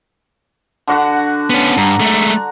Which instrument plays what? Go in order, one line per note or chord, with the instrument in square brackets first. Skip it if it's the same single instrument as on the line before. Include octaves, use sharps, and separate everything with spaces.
[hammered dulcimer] D3 F#4 F#5
[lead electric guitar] B3 C#4
[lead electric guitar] G2 [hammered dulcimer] A#5
[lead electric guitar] G#3 A3